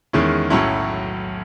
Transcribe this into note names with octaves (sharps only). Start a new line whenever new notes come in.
E2 D#3 G#3 C#4 E4
B1 A2 F#3 C#4 E4